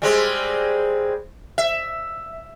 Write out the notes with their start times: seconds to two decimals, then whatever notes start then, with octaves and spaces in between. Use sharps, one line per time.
0.02 G3 G#3 C4
1.58 E5